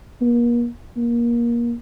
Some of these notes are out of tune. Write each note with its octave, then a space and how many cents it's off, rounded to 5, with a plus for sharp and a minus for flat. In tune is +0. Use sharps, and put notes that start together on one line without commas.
A#3 +40
A#3 +25